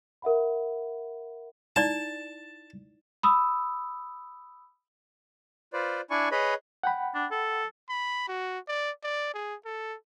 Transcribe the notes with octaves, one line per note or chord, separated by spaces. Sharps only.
A#4 E5 F#5 B5
D#4 E4 D5 A5
B5 D#6 E6
F4 B4 C5 D5
D4 E4 D5 G#5 C#6
G#4 B4 C#5 D#5 B5
F#5 G5 B5
D4
A4
B5
F#4
D5
D5
G#4
A4